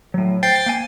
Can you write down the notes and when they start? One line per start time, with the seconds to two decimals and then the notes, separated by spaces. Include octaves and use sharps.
0.14 A2 F#3
0.43 C5 G5 A6 C7
0.66 A#3 G#5